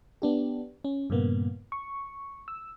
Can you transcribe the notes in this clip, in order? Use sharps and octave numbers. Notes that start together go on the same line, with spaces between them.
B3 D4 G4
C#4
G2 A#2 C#3 A#3 B3
C#6
E6